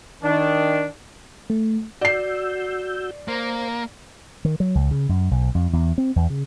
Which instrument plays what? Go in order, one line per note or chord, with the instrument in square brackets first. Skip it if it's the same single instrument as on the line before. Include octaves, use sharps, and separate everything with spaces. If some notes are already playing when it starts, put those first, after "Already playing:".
[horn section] D#3 D4
[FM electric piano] A3
[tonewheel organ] F#4 E6 G6 [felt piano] D5 C7
[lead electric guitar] A#3 [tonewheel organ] C5 A#5
[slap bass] D#3
F#3
C#2
C#3
F#2
B1
F2
E2
C4
E2
C#3